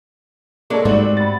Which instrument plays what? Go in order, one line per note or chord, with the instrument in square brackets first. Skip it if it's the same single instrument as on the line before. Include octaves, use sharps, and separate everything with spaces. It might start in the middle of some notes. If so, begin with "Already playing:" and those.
[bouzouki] F#3 G#3 D5 [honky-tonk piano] A#3 A4
[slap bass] G#2 A3 [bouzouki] G3 C4 F#4 [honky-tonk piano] D5 F#7
[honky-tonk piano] B5 A6